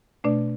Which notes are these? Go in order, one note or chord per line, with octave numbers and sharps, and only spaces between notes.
B2 A3 D4 D5